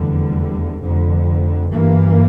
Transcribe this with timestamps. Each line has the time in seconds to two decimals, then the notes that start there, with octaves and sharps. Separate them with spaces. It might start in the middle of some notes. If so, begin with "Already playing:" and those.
Already playing: F1 E2 D3 G3
0.81 F1 F2 D3
1.71 G1 G2 E3 A#3